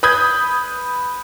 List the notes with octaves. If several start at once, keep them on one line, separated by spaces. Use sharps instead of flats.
B4 B5 D#6 G6 G#6